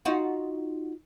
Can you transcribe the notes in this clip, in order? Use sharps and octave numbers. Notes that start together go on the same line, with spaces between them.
D#4 F4 F#4